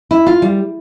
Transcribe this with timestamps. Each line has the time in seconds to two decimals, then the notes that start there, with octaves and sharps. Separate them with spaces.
0.11 E4
0.27 F4
0.42 G3